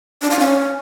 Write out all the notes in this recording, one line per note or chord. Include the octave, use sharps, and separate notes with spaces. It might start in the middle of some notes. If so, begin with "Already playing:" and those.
D4
F5
C#4